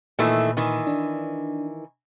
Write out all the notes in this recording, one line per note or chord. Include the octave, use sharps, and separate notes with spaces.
A#2 D#3 E3 A3
D#3 E3
D4